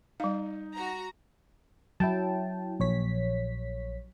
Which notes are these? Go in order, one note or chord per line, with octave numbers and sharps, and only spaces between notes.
G3 D#4 F5
F#4 A#5
F#3 E4 G5 A5
A#1 C#5 B6